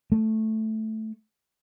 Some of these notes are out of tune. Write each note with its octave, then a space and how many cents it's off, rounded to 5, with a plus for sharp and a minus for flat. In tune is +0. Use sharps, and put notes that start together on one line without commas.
A3 -5